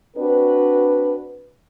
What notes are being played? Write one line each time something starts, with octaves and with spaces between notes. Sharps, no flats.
C4 D4 F#4 B4